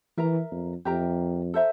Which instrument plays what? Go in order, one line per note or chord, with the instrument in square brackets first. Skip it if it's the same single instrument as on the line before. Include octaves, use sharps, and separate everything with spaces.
[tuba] E3 [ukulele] A#4 E5 A#5
[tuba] F2
[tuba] F2 [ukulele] G4 A#4 E5 A#5
[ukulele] A4 C5 E5 A#5